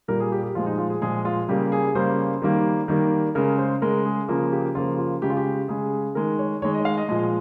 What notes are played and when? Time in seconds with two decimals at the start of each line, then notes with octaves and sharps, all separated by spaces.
0.08 A#2 G3 A#3 A#4
0.20 G#4
0.32 G4
0.43 G4
0.55 A#2 F3 G#3 F4
0.66 D#4
0.78 F4
0.90 G#4
1.02 A#2 F3 G#3 G#4
1.25 F4
1.49 C#3 G3 A#3 G4
1.72 G#4
1.95 C#3 G3 A#3 C5
2.42 D#3 G3 A#3
2.88 D#3 G3 A#3
3.35 C#3 G#3 A#4
3.58 C5
3.82 C#3 G#3 A#4
4.05 G#4
4.29 C#3 F3 A#3 F4
4.52 G4
4.75 C#3 F3 A#3 F4
4.99 F4
5.22 C#3 G#3 G4
5.30 F4
5.37 G4
5.68 C#3 G#3 G#4
6.15 D#3 G#3 A#4
6.39 C#5
6.62 D#3 G#3 C#5
6.74 D#5
6.85 F5
6.97 D#5
7.09 A#2 F3 G#3 D#5